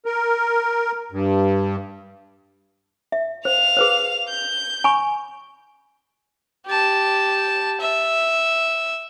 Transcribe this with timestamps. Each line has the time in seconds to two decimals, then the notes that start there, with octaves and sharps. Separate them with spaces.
0.05 A#4
1.12 G2
3.12 E5
3.45 C5 F5 F7
3.77 G#4 B4 C5
4.29 G6
4.84 G#5 B5 C#6
6.66 G4 A5
7.81 E5